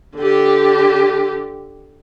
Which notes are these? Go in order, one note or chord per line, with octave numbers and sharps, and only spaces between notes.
D3 G4